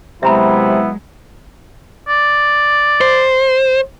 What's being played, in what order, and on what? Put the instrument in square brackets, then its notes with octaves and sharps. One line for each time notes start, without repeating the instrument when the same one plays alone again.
[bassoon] C3 [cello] F#3 G#3 [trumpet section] B3 E4 [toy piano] E5 A#5 B5
[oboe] D5
[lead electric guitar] C5